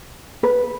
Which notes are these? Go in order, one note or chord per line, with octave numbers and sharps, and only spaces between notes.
B4